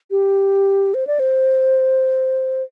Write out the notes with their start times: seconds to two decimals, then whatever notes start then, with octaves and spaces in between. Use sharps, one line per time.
0.11 G4
0.94 C5
1.07 D5
1.19 C5